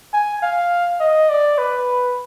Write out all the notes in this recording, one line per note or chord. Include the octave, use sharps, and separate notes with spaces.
G#5
F5
D#5
D5
B4